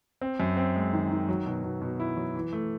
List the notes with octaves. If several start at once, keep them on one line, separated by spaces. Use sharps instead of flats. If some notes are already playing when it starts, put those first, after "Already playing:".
C4
F#2
C4
G#3
D#3
D#3
F#3
B2
B2
B2
E4
F#3
E3
A3